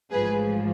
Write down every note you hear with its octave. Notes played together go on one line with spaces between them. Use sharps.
A1 G#2 F3 G#4 B4